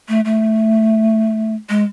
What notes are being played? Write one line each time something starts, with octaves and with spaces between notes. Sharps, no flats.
A3
A3
G#3